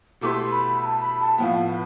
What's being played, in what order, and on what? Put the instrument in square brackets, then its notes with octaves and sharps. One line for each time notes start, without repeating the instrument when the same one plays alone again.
[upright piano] B2 A3 E4 G4 B4 [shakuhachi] C6 D6
[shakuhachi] B5
B5
A5
B5
A5
[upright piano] A2 F3 B3 [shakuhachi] F5 G5
[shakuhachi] B4